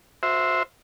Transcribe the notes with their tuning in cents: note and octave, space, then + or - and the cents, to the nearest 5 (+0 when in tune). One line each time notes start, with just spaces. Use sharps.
F#4 -35 C5 +0 E5 +0